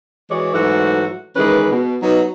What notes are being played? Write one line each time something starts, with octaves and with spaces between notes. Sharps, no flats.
E3 G#3 F#4 C#5 D5
G#2 E3 F#3 A3 F#4
D#3 E3 G#3 C#4 B4
B2
F#3 B3 D#4